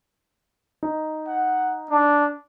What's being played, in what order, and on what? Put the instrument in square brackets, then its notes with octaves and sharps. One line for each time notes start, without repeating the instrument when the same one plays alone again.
[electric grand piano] D#4
[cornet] F#5
D4